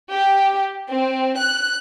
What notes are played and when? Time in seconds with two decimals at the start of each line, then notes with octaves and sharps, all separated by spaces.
0.11 G4
0.89 C4
1.37 F#6